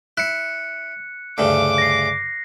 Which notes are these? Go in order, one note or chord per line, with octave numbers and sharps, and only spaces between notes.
E4 F#6 C#7
D2 G2 C#3 D6
A#6 C7